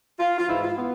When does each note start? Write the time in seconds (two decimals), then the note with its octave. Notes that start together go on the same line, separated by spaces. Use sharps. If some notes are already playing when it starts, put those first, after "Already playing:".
0.19 F4
0.38 F4
0.48 G#2 E3 E4
0.62 F4
0.76 B3